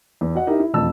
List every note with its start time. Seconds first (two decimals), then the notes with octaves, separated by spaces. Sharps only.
0.21 E2
0.35 F#4 D#5 F#5
0.47 D#4 E4 G4 A#4 E5
0.60 E4
0.74 E1 F2 A3 A5 E6